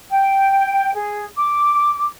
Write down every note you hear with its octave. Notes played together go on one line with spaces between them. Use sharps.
G5
G#4
D6